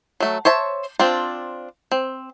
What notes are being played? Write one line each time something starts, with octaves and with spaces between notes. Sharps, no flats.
F#3 A3
C5 C#5 E5 A5
C4 D4 F4
C4